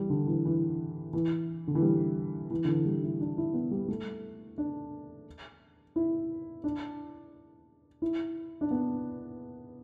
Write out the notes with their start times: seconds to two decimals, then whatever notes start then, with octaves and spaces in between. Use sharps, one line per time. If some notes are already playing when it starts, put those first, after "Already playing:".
Already playing: E3 G3
0.10 D3
0.27 E3
0.45 E3
1.13 E3
1.67 D3
1.75 E3
1.82 G3
2.51 E3
2.65 D3
2.68 E3
2.86 G3
3.03 E4
3.21 D4
3.38 E4
3.54 B3
3.71 G3
3.88 A3
4.58 D4
5.96 E4
6.64 D4
8.02 E4
8.61 D4
8.71 B3